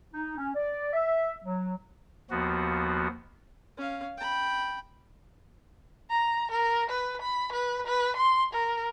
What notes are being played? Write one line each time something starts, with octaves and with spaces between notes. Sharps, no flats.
D#4
C#4
D5
E5
F#3
D#2 F3 B3 F#4
C#4 F5
G5 B5
A#5
A#4
B4
B5
B4
B4
C6
A#4